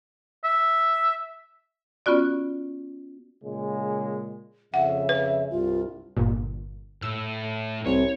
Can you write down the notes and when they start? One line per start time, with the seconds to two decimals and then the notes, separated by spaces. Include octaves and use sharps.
0.44 E5
2.06 B3 C#4 F4 F#4 D5
3.43 A#2 C#3 G#3
4.74 F2 C#3 E5 F#5
5.09 B4
5.51 C2 G2 F4
6.16 G1 A#2
7.02 A2 E6
7.85 C2 C4 C#5